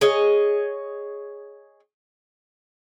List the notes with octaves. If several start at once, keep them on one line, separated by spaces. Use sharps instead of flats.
G#4 C#5 D#5